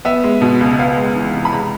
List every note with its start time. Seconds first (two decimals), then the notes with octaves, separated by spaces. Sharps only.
0.05 B3 E5
0.24 G#3
0.42 B2
0.61 C#2
0.79 B3 F5
0.97 G#3
1.16 E3
1.34 C3
1.45 B5
1.52 G#3 A#5